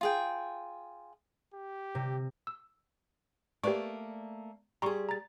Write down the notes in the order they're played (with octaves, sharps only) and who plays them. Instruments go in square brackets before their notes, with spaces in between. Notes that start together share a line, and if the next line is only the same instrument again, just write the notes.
[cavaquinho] F4 G#4 G5
[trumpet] G4
[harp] C3
[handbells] E6
[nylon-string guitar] A3 A#3 D5 [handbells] G4 B4 C#6
[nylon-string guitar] G3 G#4 [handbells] A#5 C6 C#6
[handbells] A#5 A6